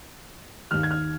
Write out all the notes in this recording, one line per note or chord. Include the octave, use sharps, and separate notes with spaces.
D#2 D#3 F6
G#6
F6